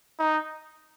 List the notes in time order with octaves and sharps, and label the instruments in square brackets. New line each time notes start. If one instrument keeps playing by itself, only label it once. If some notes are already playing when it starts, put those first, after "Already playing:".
[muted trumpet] D#4